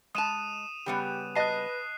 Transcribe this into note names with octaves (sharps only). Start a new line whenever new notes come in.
G#3 A5 D#6 D#7 E7
C#3 G3 B3 G4
B4 D#5 A5 F#6 C7